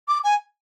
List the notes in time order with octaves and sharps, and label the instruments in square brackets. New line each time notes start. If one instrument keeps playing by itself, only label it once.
[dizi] D6
G#5